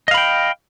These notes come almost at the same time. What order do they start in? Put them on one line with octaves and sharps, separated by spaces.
D#5 F5 B5 G5